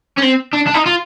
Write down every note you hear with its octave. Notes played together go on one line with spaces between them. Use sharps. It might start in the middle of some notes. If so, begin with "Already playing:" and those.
C#4
C4
D4
D4
D#4
F4